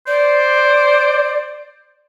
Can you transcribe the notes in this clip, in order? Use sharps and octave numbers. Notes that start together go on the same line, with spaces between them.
C5 D5